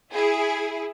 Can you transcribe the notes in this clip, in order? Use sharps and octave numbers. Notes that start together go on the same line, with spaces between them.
E4 G#4